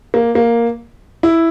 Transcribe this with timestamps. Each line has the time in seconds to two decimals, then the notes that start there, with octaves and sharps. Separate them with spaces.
0.14 A#3
0.35 A#3
1.23 E4